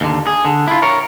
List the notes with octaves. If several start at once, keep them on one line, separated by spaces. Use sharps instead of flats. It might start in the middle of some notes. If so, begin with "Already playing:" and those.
D#2 D3
G#4
D3
E4 F4
A#4 C#5